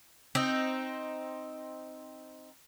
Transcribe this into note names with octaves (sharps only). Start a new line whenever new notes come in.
C4 D#4